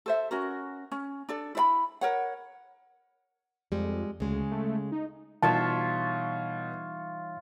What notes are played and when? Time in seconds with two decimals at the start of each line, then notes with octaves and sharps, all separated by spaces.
0.06 A4 C5 E5
0.31 C#4 F#4 A#4
0.92 C#4
1.29 D4 A4 D5
1.55 E4 D5 B5
2.01 A#4 C#5 F#5
3.72 F2 G3 G#3
4.20 D2 C#3 G#3
4.51 A3
4.92 D#4
5.43 B2 E3 G3 D#4 F4 C#5 E5 A5